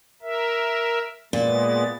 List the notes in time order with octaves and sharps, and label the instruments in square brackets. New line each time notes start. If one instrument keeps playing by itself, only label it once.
[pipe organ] A#4 E5
[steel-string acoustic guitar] A#2 [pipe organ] G#3 B3 A6